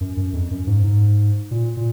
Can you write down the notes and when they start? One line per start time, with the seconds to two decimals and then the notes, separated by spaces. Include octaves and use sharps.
0.01 F#2
0.17 F#2
0.33 F2
0.51 F#2
0.67 G#2
0.84 G#2
1.51 A#2
1.77 A#2